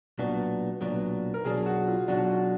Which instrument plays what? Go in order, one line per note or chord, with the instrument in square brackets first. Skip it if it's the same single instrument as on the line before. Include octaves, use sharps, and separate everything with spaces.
[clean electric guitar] B1 A#2 F#3 B3 D4 [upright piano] F#4
[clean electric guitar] B1 A#2 F#3 B3 D4
[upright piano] A#4
[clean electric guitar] B1 B2 F#3 D4 [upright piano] G#4
[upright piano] F#4
F4
[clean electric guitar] B1 B2 F#3 D4 [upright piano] F#4
[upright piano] F#4